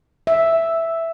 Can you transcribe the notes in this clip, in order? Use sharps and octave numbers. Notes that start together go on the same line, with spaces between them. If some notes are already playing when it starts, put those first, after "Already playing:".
E5